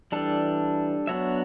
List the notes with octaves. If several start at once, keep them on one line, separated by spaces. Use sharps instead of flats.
E3 G3 D4 A4
F#3 B3 D4 F#4 C#5 E5